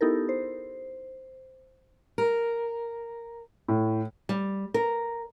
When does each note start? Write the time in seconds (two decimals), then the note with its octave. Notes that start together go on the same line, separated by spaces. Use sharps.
0.01 B3 D#4 E4 G4 A4 A#4
0.29 C5
2.18 A#4
3.68 A2
4.29 G3
4.74 A#4